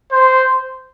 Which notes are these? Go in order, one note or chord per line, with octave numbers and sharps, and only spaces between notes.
C5